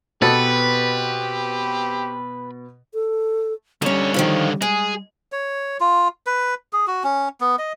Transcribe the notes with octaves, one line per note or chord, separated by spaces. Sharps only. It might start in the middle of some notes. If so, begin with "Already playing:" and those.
B2 B3 C4 G4 A4 B4 A6
A4
D#2 D3 G3 C#4 C#5
D#3 F3 F4
G#3 G#4
C#5
F4
B4
G#4
F#4
C#4
B3
D#5